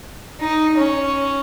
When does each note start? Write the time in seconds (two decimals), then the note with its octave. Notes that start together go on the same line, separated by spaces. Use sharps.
0.40 D#4
0.77 C#4